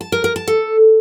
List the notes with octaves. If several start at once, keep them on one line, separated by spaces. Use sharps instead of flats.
A5
A#4
A#4
A5
A4